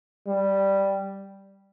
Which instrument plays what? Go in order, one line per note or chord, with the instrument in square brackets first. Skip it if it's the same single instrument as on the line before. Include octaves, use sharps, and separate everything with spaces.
[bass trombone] G3